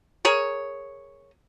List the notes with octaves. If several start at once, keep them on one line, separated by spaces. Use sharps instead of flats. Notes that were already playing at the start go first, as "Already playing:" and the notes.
G#4 A#4 C#5